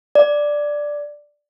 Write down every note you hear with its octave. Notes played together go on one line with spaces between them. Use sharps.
D5